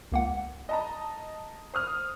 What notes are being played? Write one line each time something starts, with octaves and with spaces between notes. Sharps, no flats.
C#2 A#3 F#5
D#5 A5 A#5
C5 D#6 F6